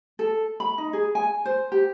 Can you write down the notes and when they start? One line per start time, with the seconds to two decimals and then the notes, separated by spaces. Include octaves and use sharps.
0.19 A4
0.60 B5
0.78 D#4
0.93 G#4
1.15 G#5
1.46 C5
1.72 G4